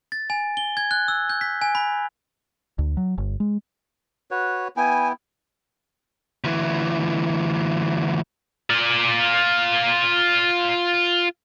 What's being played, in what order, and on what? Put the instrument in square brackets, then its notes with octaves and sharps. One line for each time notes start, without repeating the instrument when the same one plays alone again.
[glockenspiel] A6
G#5
G7
G#6
F#6
E6
G6
B6
G#5
B5
[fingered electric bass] D2
F#3
G1
G#3
[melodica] F#4 B4 C#5
[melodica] B3 E4 G5 [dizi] G#5
[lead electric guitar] D2 E3
[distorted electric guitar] F4 D5